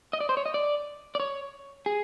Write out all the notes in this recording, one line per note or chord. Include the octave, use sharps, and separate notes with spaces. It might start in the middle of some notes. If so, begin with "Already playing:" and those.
D#5
D5
C5
C#5
D#5
D5
D5
C#5
G#4